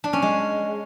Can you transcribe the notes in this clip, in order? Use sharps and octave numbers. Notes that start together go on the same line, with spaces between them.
D4
C#4
G#3